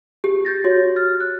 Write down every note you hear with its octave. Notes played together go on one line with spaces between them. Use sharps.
G4
G6 A6 A#6
F#4 C#5
F6 A6
F#6